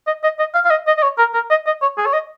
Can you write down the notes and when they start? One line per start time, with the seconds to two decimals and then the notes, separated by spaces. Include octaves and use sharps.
0.07 D#5
0.24 D#5
0.39 D#5
0.55 F5
0.65 F5
0.71 D#5
0.87 D#5
0.98 D#5
1.03 C#5
1.18 A#4
1.34 A#4
1.50 D#5
1.67 D#5
1.82 C#5
1.98 G#4
2.06 C#5
2.13 D#5